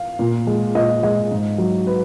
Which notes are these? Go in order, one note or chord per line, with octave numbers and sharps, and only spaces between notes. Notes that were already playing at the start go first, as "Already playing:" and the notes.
Already playing: F5
A#2
G#3
A#2 D#5
G#3 D#5
G#2
F#3
B4